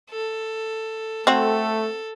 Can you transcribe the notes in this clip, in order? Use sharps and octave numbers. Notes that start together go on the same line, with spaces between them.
A4
A3 C4 F#4 A4